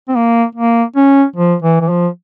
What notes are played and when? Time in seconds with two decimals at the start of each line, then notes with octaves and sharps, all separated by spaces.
0.09 C4
0.16 A#3
0.55 A#3
0.96 C#4
1.36 F3
1.63 E3
1.81 E3
1.89 F3